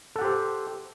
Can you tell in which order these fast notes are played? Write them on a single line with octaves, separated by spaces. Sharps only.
A4 F#5 G4 C5